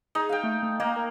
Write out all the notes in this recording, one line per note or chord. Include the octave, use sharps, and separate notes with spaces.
D#4 G#4
F5 G5
A3
A3
A#3 D#5
A#4